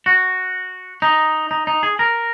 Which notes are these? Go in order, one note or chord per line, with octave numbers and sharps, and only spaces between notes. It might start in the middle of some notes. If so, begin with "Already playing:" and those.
F#4
D#4
D#4
D#4
G#4
A#4